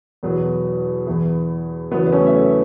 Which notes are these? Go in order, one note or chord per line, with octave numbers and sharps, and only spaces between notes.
E2 B2 F#3 B3
E2 E3
E2 C#3 F#3 B3
B3
A3 C#4
E5
A4 C#5